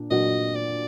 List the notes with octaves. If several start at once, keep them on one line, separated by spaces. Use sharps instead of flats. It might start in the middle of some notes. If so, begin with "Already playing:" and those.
Already playing: A#2 D4
A#2 F#3 D4 F#4 D#5
D5